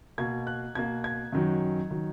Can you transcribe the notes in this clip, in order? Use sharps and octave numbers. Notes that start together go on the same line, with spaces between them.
B2 A#3 G#6
F#6
B2 A#3 G#6
G#6
F#2 D#3 F#3
D#3 F#3